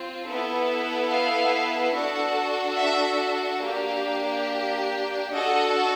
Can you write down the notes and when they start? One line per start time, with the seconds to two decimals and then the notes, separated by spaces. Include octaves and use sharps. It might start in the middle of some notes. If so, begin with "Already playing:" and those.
Already playing: C4 F4
0.26 B3 E4 A4
1.10 F5
1.94 D4 F#4 A4
2.80 E5
3.64 A#3 D4 G4 F5
5.33 D4 F#4 A4 D#5